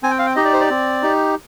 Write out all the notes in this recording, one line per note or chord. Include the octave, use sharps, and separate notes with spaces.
C4 G#5
G5
F5
G5
D#4 G4 D#5
D5
C5
D5
C4
D#4 G4